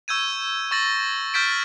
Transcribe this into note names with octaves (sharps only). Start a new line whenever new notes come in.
C#6 E6 G6 G#6 D#7
C#6 E6 A6 A#6 F#7
C#6 F6 G6 A6 B6 D7